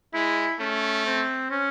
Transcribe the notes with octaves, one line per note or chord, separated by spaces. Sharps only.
G#3 E4
A3 C#4
C4
C#4